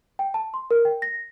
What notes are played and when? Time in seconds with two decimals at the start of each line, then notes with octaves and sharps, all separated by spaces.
0.19 G5
0.34 A5
0.54 C6
0.71 A#4
0.85 G5
1.02 A#6